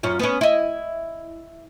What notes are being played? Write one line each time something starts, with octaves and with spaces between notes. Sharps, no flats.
F#2 C#4 F4
B3 C#4
E4 D#5